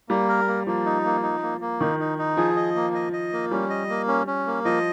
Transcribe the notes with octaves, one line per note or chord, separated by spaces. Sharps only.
G3 A#3
A#4
A#3
F3 A#3
D#4
A#3
D#4
A#3
A#3
D#3 D#4
D#4
D#4
F3 G#4
D#5
A#3
D#5
D#5
A#3
G3 C#4
D#5
A#3
C#4
C#4
A#3
F3 D#5